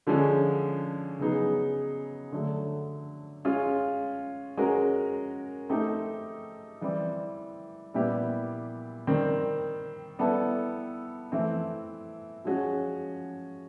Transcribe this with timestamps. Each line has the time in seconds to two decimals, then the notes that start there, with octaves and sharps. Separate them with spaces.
0.07 D3 F3 G#3 C#4
1.19 C#3 F#3 B3 D#4 G#4
2.32 D3 F#3 A3
3.45 G#3 C#4 F4
4.57 G#3 C#4 F#4 A#4
5.69 A3 C4 D#4 G4
6.81 E3 G3 C4
7.94 A#2 G3 B3 E4 G4
9.07 D#3 G3 C4
10.19 G3 B3 E4 A4
11.32 E3 A3 C4 E4
12.45 F3 G#3 C#4 F#4